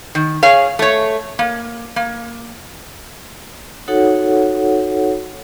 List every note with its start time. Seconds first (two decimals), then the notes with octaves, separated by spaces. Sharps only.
0.15 D#3
0.43 G#4 C#5 F5
0.79 A3 C#5
1.39 A#3
1.96 A#3
3.88 D#4 F#4 A4 C#5 F#5